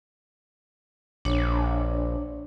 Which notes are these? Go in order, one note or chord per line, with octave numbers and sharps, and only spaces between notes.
A#1 D4 C#5